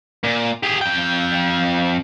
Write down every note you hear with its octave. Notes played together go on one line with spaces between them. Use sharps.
A#2
G4 G#4
F2 G5